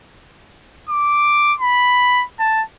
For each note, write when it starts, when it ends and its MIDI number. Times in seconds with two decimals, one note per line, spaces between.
0.89 1.54 86
1.60 2.24 83
2.39 2.62 81